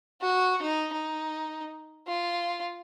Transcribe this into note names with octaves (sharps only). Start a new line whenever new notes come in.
F#4
D#4
D#4
F4